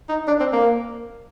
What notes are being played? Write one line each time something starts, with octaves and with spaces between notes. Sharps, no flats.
D#4
D4
C4
A#3